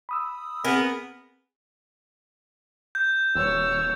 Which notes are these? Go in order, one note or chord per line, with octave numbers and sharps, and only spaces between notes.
B5 D#6 E6
B3 C4 G#4 A#4
G6
D#1 C#5 E6